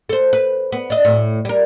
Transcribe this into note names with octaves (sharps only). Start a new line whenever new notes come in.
A4 C5
B4
B3
D4 D#5
A2
G3 A#4